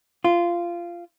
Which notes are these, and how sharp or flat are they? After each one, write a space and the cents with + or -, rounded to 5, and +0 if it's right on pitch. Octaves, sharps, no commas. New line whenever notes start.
F4 -15